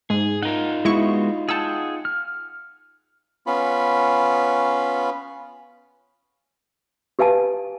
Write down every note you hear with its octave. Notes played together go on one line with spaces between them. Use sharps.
G#2 G#4
D#4 F4 A#4 F#5
G#3 B3 E4 F#4 C#6
G#4 F#5 G5 A5 E6
F6
B3 C#4 F4 B5
G4 B4 F5 G#5 A5